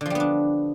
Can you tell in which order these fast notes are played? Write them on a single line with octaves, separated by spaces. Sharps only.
D3 F3 G3 B3 D4